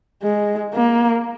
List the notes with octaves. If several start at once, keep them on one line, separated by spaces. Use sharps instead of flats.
G#3
A#3